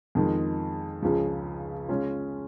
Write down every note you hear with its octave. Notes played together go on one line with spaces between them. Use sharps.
F2 D#3 G#3
C#2 C#3 F3 G#3
C#3 G#3 C#4 F4